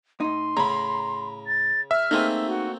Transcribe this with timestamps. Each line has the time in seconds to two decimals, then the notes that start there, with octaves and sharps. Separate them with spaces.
0.20 A2 D#4 C6
0.57 A2 C#3 A#5 B5
1.46 A6
1.91 E5 F6
2.11 A3 A#3 C4 D#4 G#4
2.46 F#4